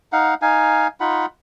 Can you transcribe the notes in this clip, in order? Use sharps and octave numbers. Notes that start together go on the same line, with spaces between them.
D#4 F5 F#5
D#4 F5 G#5
D#4 F4 F#5 B5